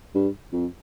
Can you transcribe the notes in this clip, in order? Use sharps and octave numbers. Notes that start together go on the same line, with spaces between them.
G2
F2